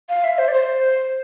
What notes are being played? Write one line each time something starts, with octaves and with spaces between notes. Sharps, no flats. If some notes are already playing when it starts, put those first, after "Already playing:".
F5
E5
C5
D5
C5